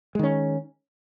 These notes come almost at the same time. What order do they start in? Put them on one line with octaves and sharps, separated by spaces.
G#3 D#3 C#4